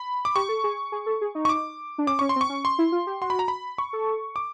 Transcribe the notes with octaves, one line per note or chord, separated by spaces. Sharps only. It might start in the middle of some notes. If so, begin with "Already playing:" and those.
Already playing: B5
D6
G4 C#6
A4
G#4
G#4
A4
G#4
D#4
C#6
D6
D4
C#4 D6
C#4 C#6
C6
C4
C#6
C#4
C6
E4
F4
G4
F#4 C6
B5
A#5
B5
C#6
A4
D6